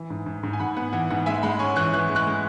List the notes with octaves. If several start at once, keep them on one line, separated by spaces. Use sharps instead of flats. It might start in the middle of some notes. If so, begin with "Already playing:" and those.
Already playing: E3
G#2
G#2
G#2
G#5
G#2 F#5 B5
B3 F#5
E3 F#5
G#2 F#5
G#3 E5 G#5
G#3 F#5 B5
C#4 G#5 C#6
E3 C#6 F#6
E3 C#6 F#6
G#3
C#6 F#6
G#3